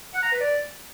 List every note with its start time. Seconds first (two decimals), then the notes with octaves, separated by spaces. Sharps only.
0.14 F#5
0.23 A#5
0.32 B4
0.40 D5